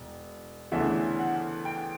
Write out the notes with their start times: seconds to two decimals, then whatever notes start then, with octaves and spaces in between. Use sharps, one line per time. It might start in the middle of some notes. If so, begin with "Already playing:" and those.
Already playing: E1
0.72 D2 C#3 E3 B3 D4 E5
1.19 F#5
1.65 G5